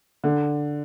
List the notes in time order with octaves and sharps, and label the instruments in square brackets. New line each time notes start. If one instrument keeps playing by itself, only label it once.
[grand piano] D3